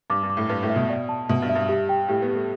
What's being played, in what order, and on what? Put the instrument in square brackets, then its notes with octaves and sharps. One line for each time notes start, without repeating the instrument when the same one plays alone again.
[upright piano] G2 [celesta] D6
[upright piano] G2
[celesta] D6
[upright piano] A2
[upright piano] G2 [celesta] B4
[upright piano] A2
[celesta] E5
[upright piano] B2
[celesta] D5
A5
[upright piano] B2 [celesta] E5
[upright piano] G2
[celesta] E5
[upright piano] G2
[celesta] G4
G5
[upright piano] A2 [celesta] G4
[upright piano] B3
[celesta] G4
[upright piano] A3